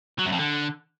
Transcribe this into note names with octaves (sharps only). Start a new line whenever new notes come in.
F#3
F#2
F2
D3